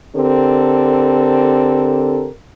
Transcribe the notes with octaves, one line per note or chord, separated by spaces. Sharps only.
D3 C4 G4 A4 A#4